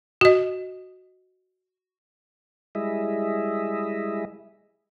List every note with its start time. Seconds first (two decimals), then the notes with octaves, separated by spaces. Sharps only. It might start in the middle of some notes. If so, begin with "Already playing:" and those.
0.21 F#4 D#5
2.75 G3 G#3 E4 G#4 D#5 E5